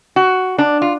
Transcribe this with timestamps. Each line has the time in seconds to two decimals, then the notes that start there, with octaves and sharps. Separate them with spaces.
0.16 F#4
0.58 D4
0.82 F4